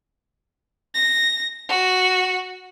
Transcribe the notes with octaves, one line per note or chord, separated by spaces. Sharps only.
A#6
F#4